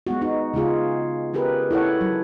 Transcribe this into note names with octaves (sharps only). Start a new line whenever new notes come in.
G#3 B3 F#4
D#4 F#4
C#3 G#3 F4 G#4
C#4 G4 G#4 A#4 B4
E4 A4 C#5 F#5
F#3